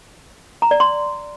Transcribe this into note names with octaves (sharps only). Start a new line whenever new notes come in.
A#5
D5
C6